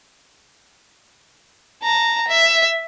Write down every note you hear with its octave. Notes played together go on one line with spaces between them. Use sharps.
A5 A#5
E5